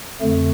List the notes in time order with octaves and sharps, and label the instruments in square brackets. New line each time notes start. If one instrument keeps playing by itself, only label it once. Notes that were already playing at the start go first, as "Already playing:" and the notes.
[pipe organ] F2 D3 A3